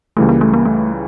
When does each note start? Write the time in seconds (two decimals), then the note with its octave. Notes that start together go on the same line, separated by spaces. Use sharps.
0.17 C#2 C#3 E3 G3 A3
0.29 A#3
0.41 A3
0.54 A#3
0.65 A3